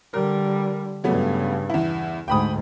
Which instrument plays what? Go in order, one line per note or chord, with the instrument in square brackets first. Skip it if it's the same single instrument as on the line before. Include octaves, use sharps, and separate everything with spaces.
[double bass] D3 G3 [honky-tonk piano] A#4
[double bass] G2 C#3 [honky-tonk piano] F#3 A3 B3
[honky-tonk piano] E2 E4
[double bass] D2 G#2 [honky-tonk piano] G5 B5 D#6